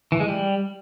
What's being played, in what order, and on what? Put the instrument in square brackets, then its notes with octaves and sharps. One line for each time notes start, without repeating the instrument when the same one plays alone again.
[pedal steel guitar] E3
G#3
G3